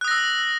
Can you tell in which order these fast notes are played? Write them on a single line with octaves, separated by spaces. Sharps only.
F#6 D#6 A#6 E6